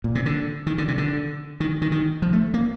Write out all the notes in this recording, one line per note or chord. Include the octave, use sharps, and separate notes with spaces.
A#2
C3
D3
D#3
D3
C3
D3
D#3
D#3
D#3
F3
A3
A#3